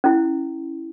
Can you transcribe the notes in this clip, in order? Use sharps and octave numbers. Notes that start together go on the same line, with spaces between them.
C#4 E4